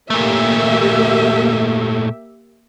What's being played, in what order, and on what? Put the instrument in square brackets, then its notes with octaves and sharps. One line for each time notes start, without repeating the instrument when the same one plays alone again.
[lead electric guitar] A#2 A3 [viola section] A#3 G4 E5